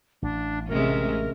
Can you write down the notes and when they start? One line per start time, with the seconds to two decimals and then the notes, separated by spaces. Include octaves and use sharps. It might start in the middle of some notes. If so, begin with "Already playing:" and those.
0.22 A1 D4
0.69 D2 C3 G#3 C#4 A#4 E5